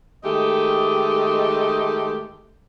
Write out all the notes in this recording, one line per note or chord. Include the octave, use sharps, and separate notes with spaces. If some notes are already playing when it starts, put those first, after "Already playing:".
D#3 G#3 A3 G4 D#5